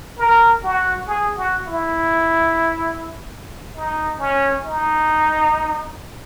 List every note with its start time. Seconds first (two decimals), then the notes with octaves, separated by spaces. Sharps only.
0.18 A#4
0.63 F#4
1.08 G#4
1.38 F#4
1.67 E4
3.76 D#4
4.20 C#4
4.64 D#4